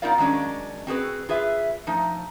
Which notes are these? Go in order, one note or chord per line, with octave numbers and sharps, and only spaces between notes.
B3 D#4 F4 A#4 D5 F5
D#3 F#3 G#3 C#4 D4
C4 F#4 G#4 B4
F4 G#4 B4 E5
F3 A3 D#4